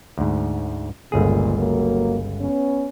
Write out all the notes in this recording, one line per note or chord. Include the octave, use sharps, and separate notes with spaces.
D2 G#2
G1 C#2 A#2 G#4
F#3 A#3
B3 C#4